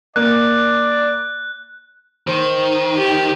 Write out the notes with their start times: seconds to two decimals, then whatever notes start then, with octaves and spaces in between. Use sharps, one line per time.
0.16 A#3 D5 F#6
2.27 D#3 C5
2.96 G4